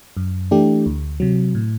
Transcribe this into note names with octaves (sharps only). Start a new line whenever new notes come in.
F#2
E3 A3 D4 G4
D2
C3 F#3
A2